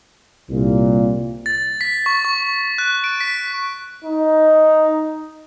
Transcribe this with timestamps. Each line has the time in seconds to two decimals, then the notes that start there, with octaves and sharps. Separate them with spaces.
0.50 C2 A#2
1.46 A6
1.81 B6
2.06 C#6
2.25 C#6
2.78 F#6
3.04 D7
3.21 B6
4.04 D#4